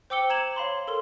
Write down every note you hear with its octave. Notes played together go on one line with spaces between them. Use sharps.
C5 G5 D6 E6 C#7 G7
A#5 G#6 E7 F#7
C#5 F5 B5 C6
A4 A#4 C6